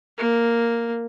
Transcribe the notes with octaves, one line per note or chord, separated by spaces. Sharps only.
A#3